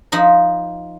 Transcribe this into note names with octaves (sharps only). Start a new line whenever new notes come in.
F3 D#4 B5